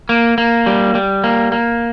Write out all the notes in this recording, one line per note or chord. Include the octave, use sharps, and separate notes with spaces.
A#3
A#3
G3
G3
A#3
A#3